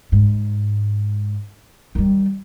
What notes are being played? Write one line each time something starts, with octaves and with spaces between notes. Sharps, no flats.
G#2
D#3 G3